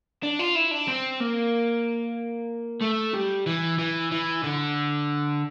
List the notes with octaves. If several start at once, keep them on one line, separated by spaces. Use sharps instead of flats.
D4
F4
E4
D4
C4
A#3
A3
G3
E3
E3
E3
D3